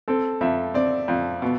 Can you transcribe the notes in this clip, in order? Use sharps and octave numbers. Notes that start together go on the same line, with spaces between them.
C4 A4
F2 E5
C4 D5
F2
B2